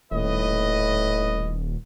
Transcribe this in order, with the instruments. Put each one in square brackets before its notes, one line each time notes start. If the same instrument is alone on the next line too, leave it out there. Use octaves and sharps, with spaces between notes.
[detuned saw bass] D#1 [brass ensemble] A2 B4 D#5